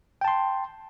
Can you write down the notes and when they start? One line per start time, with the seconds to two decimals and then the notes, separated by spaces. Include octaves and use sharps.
0.21 G5
0.25 A5
0.28 C6